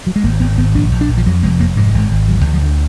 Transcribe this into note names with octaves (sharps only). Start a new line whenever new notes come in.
F#3
G#3
G#1 A#3
G#1 B3
G#1 B3
A#1 D4
A#1
D4
A#1
F3
F2 F#3
F1 G#3
F1 A#3
G#2 G#3
G#1
G#1
D2 F#3
D2 D#3
F3
D3